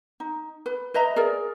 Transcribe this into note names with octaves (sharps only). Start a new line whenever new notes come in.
D#4
B4
B4 D#5 E5 A#5
G#4 A#4 D5